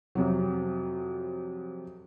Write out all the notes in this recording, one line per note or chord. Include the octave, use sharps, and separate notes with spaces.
F2 C3 F#3